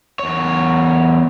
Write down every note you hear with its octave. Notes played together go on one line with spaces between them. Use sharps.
E2 C#5